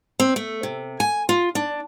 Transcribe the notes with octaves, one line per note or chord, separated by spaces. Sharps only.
C4
A3
C3
G#5
F4
D4